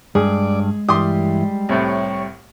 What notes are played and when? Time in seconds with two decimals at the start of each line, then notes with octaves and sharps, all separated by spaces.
0.15 G2 G#3 G#4 D5
0.89 G2 E3 G3 C6 D6 D#6
1.69 C2 A2 C#5